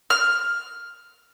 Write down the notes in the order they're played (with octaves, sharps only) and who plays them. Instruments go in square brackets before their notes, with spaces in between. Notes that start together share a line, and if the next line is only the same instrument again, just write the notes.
[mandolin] F6